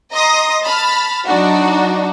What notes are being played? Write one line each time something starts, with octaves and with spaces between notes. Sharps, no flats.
D#5 A#5 C6 D#6 A#6
A5 B5 F6
F#3 D4 D#4 F#4